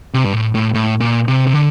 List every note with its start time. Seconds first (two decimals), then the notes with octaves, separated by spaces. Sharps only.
0.14 C3
0.24 G2
0.33 A2
0.55 A2
0.74 A2
1.00 A#2
1.28 C3
1.47 C3
1.53 D3